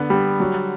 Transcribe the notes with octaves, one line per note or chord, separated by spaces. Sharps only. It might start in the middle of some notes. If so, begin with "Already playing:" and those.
Already playing: D3 B3
G3
F#3